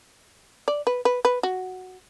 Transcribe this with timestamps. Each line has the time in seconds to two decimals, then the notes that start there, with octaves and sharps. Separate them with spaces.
0.68 D5
0.87 B4
1.05 B4
1.25 B4
1.43 F#4